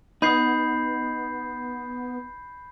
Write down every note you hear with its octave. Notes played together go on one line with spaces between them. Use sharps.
B3 D#4 B5 G6 C7